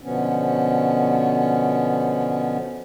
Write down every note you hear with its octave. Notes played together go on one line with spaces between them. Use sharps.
B2 D3 F3 B3 C#4